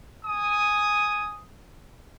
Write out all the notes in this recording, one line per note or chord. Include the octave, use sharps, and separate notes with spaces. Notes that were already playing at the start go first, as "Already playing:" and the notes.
G#5 D#6